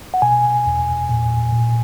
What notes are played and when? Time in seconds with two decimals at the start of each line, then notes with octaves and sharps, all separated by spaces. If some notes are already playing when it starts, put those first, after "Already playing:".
0.14 F#5
0.22 B2 G#5
0.66 E2
1.09 A#2
1.52 A#2